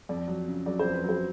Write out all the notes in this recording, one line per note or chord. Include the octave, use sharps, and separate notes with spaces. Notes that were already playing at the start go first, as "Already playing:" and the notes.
F2 D5
F#3
C#3
F#3 D5
C5
F2
B4
F#3 C5